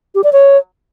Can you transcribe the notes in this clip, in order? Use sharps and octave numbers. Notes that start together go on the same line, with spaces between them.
G4
D5
C#5